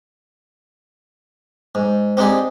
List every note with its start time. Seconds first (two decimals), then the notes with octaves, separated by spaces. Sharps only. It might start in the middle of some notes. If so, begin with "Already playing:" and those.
1.75 G#2
2.17 C4 D4 D#4 G4 G#4